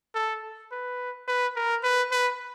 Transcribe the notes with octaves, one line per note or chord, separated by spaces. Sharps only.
A4
B4
B4
A#4
B4
B4